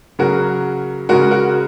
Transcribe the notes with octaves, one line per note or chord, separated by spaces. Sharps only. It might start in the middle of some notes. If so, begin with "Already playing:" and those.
C#3 F#3 F#4 A#4
C#3 G#3 F#4 A#4
F#4 A#4